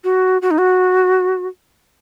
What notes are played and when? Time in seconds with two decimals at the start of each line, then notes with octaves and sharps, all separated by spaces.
0.04 F#4
0.42 F#4
0.51 D#4
0.59 F#4